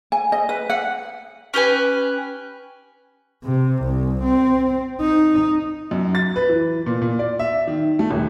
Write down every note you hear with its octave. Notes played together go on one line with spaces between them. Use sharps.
G#5
D#5
B4
F#5
C#4 G4 B4 G#5
C3
C2
C4
D#4
F#2
A6
B4
E3
A#2
A#2
D5
E5
D#3
A3
D#1